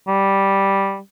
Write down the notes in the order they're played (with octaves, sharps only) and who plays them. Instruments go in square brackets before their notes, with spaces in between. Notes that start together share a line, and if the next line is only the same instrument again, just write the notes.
[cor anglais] G3